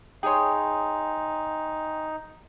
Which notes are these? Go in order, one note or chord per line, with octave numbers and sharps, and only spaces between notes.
D#4 G#4 C#5 G5 G#5 C6